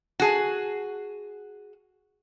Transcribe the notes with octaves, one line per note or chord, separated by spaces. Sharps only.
F#4 G#4